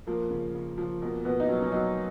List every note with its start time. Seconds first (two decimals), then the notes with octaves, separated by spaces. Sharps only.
0.07 F3 A#3
0.30 C#3
0.54 C#3
0.78 F3
1.01 B2 A#3
1.24 B2 B3
1.40 D#4
1.49 F#3 C#4
1.62 C#4
1.72 F#3 D#4